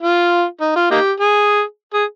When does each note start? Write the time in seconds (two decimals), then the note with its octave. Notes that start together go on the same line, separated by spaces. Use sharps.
0.02 F4
0.61 D#4
0.76 F4
0.91 A#3 D#4 G4
1.20 G#4
1.94 G#4